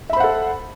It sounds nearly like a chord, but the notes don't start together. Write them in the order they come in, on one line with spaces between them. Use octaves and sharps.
E5 B5 C5 F#5 A4